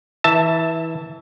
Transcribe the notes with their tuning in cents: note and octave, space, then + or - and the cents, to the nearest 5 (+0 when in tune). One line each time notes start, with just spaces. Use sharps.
E3 -20 E5 +0 A5 +10